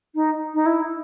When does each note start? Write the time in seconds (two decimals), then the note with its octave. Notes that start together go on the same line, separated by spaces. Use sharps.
0.15 D#4
0.54 D#4
0.66 E4